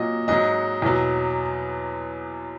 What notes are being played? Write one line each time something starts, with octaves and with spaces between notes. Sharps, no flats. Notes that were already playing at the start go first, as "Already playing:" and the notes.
Already playing: A#2 F#3 D#5
G#2 F#3 D#5
E2 B2 F#3